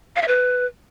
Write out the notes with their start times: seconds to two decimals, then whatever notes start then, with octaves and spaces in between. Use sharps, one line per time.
0.16 F5
0.22 E5
0.28 B4